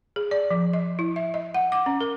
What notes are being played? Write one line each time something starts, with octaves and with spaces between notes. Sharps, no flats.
G#4
D5
F3
D#5
E4
E5
D#5
F#5
D6
C#4
A#4